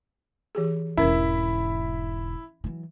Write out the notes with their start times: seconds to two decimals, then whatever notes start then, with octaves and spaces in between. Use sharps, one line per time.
0.55 E3 G4 G#4
0.97 E1 G#2 C#4 E4 A#4 E5 B5
2.64 E3 F#3